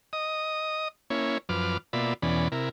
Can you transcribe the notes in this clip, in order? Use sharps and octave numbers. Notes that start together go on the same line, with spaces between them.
D#5 D#6
A#3 C#4 E4 C#5
F#2 F3 B4 D6 F6
B2 A#3 F4 D5 E5 B5
E2 B2 E3 C#4 D5 B5
C3 E4 A#4